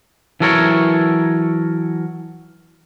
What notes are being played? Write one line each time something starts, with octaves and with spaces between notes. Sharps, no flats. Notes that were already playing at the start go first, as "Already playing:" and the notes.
E3 F#3 A4 A#4 C#5